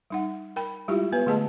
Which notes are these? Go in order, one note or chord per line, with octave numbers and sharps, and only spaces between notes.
G3 D#4 F#5
A#4 G5 B5
G3 G#3 E4 F4 G4
G#3 B3 B4
D3 A3 G#4 D#5 A5